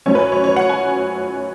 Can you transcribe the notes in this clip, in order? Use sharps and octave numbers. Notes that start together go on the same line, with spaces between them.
F#2 F#3 C#4 C#5
B4
C#5
C#5
C#5
F#5
G#5